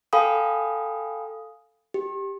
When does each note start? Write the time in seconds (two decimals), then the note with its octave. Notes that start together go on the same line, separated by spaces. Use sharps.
0.13 A4 F5 G5 G#5 B5 D#6
1.94 G4